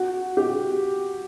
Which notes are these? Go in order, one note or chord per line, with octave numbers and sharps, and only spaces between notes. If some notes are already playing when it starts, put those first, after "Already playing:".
Already playing: F#4
G4